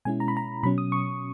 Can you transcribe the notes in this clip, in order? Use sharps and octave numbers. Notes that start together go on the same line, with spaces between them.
B2 G#3 C#4 E4 G#5
A#5
B5
A#5
B2 F#3 C#4 B5
D#6
C#6